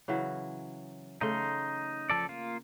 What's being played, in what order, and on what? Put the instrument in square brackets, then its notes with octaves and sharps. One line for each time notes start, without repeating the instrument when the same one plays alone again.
[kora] C#3 E3 F#3
[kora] C#3 A3 [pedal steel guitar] D#4 C6
[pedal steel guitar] F3 A4 D5
A#3 F4